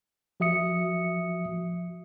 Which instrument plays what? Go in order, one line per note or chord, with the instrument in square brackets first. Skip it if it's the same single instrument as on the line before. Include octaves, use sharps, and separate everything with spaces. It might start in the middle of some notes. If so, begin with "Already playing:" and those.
[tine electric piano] F3 F#4 E5 D#6 C#7